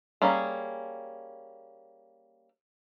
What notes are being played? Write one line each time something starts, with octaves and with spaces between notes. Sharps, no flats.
G3 A#3 C#4 G#4